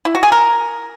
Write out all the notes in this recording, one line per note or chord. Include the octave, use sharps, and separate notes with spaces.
E4
F#4
G#4
A#4